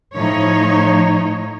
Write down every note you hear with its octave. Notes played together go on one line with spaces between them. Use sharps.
A2 F3 D#4 C#5